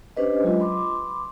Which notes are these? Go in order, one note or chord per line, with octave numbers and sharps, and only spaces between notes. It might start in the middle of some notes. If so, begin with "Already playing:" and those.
C#4 D4 G4 B4 C5 D#5
F#3 G#3 F4 D#5
B5 C6 D6